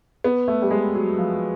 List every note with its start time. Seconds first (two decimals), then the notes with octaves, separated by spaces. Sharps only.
0.24 B3
0.48 A3
0.62 G3
0.71 G#3
0.95 F#3
1.18 F3